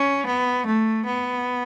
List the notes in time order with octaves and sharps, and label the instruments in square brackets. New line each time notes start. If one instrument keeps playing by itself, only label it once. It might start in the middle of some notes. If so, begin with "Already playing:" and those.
Already playing: [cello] C#4
B3
A3
B3